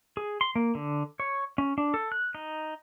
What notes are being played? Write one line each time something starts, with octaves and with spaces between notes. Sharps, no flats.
G#4
C6
A#3
D3
C#5
C#4
D4
A4
F#6
D#4